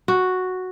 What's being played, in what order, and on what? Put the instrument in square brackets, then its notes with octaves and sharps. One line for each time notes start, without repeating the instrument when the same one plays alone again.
[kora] F#4